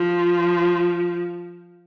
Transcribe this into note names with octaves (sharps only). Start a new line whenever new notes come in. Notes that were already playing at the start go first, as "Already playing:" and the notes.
Already playing: F3